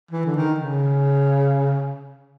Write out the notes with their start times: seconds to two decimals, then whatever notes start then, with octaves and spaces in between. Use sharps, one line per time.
0.11 E3
0.25 D3
0.36 D#3
0.60 C#3